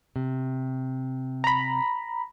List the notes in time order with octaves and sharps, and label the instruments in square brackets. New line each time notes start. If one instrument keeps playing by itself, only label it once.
[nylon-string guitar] C3
[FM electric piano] A#5 B5